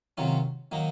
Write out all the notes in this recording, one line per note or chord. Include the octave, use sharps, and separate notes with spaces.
C3 D#3 F#3 C#4 F4
D#3 F#3 A#3 D#4